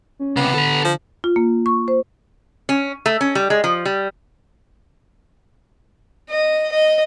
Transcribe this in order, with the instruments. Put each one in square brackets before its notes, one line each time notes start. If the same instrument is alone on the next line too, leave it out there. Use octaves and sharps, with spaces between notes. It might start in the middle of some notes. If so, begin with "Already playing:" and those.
[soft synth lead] C#4
[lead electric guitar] C#2 C3 [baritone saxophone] B3
[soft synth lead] D3 [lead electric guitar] A4 B4
[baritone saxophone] F3
[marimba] F4
A#3
C#6
C5
[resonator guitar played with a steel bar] C#4
A3
C#4
G3
G#3
F3
G3
[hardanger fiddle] D#5
D#5